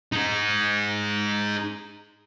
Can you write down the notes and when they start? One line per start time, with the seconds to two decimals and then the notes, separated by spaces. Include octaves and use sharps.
0.12 D#4 G#4